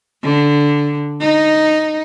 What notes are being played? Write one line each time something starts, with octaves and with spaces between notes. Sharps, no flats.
D3
D#4